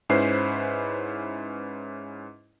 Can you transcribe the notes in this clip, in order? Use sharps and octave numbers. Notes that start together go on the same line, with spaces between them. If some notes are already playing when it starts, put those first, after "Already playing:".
G#2 C#4 E4 B4 C5 C7